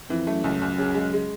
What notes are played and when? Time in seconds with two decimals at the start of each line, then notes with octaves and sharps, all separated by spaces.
0.09 F2 E3
0.27 F#2 A3
0.44 C#2 F#2
0.62 C#2
0.78 C#3
0.95 G#3
1.13 G#3